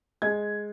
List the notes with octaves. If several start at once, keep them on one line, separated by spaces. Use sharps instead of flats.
G#3 G#6